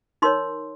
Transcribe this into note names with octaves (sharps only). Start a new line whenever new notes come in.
D#4 A#4 C#5 C6